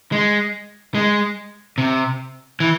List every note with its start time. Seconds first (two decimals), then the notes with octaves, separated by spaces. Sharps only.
0.12 G#3
0.95 G#3
1.78 C3
2.60 E3